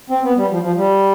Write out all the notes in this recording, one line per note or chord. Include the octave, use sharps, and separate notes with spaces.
C4
B3
G3
F3
F3
G3